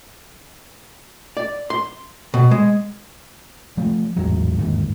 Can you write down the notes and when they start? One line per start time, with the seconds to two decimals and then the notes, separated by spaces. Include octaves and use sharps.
1.37 D5
1.70 C6
2.34 B2
2.51 G#3
3.77 F3 A3
4.16 A1 E2 G#2 F#3
4.59 G1 D#2 G#2